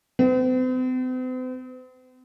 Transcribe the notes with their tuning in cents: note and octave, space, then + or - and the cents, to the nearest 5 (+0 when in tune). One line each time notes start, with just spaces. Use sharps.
C4 -45